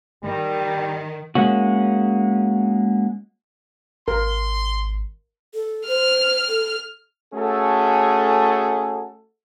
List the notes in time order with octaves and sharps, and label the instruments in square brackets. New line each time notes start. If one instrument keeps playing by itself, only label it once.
[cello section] D#3 [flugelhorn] G3
[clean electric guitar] G#3 A#3 C#4 F#4
[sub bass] G#1 [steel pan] A#4 [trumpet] C6
[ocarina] A4
[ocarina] C5 [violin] F6
[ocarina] A4
[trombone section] A3 C#4 F#4 G#4 A4